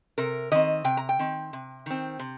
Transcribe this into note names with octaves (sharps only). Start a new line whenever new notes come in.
C3 A#4
D#3 C4 D#5
C3 G5
A#5
G5
D#3 C4
C3
D#3 C4
C3